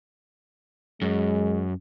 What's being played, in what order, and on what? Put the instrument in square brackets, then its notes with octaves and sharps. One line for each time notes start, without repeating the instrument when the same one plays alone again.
[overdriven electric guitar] F#2 [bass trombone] G#3